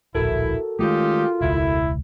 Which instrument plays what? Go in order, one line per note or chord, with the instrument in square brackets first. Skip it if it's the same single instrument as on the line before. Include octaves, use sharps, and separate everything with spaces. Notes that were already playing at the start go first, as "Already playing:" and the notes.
[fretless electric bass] D1 A#1 [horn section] E4 [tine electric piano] F#4 A4 A#4
[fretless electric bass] D#3 G#3 A3 [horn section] C#4 D#4 G4 [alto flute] F4
[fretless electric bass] E1 C#2 [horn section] E4